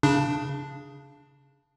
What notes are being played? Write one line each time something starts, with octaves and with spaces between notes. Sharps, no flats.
C#3 D4